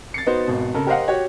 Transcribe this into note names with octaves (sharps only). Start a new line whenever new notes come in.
A6 C7 C#7
B3 D#4 F#4 C5
G#1 B2
C#3 A4 A#4
G4 A#4 C5 D#5 F5 F#5
F#4 G4 C#5